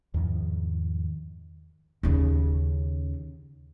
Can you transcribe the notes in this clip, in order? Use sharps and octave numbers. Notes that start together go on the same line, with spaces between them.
E2 G#2 D#3 F3
D#2 C#3